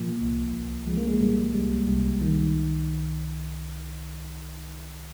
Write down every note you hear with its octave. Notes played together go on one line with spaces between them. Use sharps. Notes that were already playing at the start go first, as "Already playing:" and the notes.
Already playing: A#2 F3 A#3
C2
C2
F3 G#3
A#3
G#3
A#2 G3
C2 G3
C2
D#3